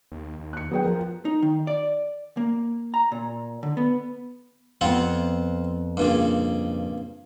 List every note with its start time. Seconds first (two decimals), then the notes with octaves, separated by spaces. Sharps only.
0.12 D#2
0.40 D#2
0.53 F#6 C#7
0.71 F#3 B3 G#4 G5
0.84 F3 A#4
1.25 D#4
1.42 D#3
1.67 D5
2.37 A#3
2.94 A#5
3.12 A#2
3.63 D3
3.77 B3
4.81 F2 B3 C4 F4 F#5
5.97 G2 A#2 C#3